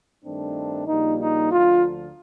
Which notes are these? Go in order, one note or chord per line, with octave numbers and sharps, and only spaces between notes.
G2 D#3 A3 C4 D4
A#1 A#2 G3 A#3 D#4
D#4
D2 D3 F3 F4